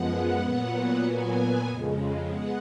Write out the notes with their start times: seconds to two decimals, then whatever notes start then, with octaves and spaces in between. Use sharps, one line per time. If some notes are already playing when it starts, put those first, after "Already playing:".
Already playing: F#2 F3 G#3 B3 F#5
0.40 A#2 F#3 B3
1.02 A#2 F#3 B3 G#5
1.66 F2 C#3 G#3
2.29 G#3 B3 F#5